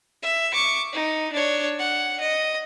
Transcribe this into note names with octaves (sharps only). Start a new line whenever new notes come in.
E5
C#6 D6
D#4
D4 C#5
F#5
D#5